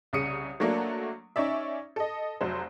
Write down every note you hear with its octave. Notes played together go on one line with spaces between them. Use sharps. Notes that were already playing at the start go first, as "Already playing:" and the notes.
C2 C#3 D#6 C#7 D#7
F#3 A3 A#3 D4
C#4 D#4 D5 E5
A4 D#5
F1 F#3 C5